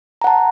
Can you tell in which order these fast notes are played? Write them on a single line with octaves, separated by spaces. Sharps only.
A#5 F#5 A5